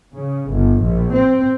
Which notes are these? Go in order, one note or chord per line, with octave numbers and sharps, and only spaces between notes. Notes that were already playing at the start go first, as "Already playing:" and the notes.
C#3
G1
A#1
C4